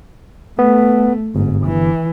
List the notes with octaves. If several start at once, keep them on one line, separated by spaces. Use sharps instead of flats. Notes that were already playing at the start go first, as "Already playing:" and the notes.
A3 B3
G1 G#2
E3